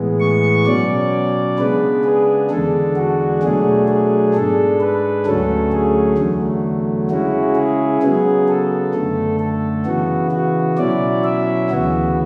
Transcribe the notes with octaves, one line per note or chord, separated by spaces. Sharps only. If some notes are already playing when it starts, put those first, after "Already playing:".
Already playing: A2 E3 G#3 B3
C#6
B2 F#3 C#4 D5
C#3 G#3 B3 D4 B4
G#4
E2 D3 G#3 D4 A4
F#4
B2 F#3 A3 D4 G#4
G#4
G#2 G#3 D4 A4
B4
D2 D3 F#3 A3 C#4 A4
G#4
E2 D3 F#3 A3
C#3 G#3 C#4 E4 F#4
G#4
C#3 F#3 B3 G#4
A4
F#2 D3 A3
A4
C#3 E3 B3 F#4
F#4
B2 F#3 C#4 E4 D5
E5
D2 C#3 E3 B3 F#4